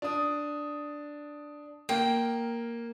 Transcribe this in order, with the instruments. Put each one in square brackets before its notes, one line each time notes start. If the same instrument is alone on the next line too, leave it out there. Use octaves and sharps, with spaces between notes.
[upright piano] D4 D#6
[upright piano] A#3 [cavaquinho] G5